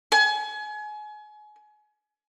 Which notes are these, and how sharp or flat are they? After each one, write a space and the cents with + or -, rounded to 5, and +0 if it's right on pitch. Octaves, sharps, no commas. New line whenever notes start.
G#5 +30